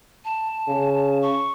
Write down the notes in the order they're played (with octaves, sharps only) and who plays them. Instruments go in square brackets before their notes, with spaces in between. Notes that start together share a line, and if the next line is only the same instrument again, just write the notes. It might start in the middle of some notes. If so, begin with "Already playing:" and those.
[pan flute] A5
[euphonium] C#3
[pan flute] C#6